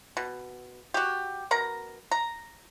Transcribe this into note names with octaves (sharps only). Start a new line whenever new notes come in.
B2
F#4 G4
B2 A#4 A#5
A#5